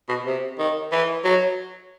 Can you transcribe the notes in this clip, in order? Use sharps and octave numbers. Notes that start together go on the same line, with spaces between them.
B2
C3
D#3
E3
F#3